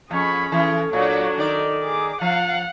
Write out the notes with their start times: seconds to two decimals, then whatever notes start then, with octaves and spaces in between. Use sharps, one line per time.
0.11 F2 C#4 G#4 B5 C#6
0.52 E3 C#4 A4
0.93 A#2 F#3 D4 C#5
1.38 D#3 D#4 D5
1.83 G#4 D6
2.21 F3 F5 F#5